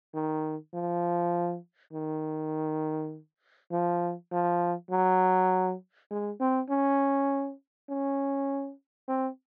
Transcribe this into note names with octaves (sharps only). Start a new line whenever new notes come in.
D#3
F3
D#3
F3
F3
F#3
G#3
C4
C#4
C#4
C4